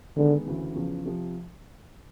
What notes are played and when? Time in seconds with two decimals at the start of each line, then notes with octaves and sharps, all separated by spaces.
0.17 D3 D#3 G#3 B3
0.46 D2 C#3 E3
0.75 E2 C#3 F3
1.05 C3 F3